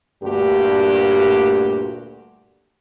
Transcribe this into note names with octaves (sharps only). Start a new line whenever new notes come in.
D2 G2 A#2 A3 F#4 G4